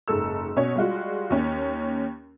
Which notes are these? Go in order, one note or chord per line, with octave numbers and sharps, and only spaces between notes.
F#1 G#2 A4 E6
B2 C#4 C#5
G3 G#3 F4 F#4
D#2 C#4